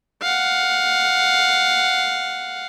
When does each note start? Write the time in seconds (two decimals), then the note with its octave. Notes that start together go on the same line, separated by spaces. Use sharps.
0.22 F5 F#5